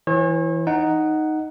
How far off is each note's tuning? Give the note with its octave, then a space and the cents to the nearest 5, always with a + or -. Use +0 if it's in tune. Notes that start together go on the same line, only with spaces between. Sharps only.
E3 +0 C#5 -40
D#4 +0 F#5 +5